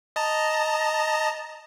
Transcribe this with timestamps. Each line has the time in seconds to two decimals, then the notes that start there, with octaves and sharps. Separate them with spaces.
0.16 D#5 A5 A#5